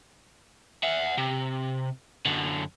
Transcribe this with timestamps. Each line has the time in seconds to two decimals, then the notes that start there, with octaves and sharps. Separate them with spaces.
0.83 E5 F#5
1.17 C3
2.26 F#2 D3